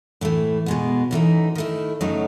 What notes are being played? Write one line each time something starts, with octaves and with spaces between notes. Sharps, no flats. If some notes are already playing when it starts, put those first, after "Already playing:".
A2 E3 A3
B2 G#3 B3
F#2 E3 A3 D#4
D#3 A3 E4
F#2 C#3 F#3 A3 D#4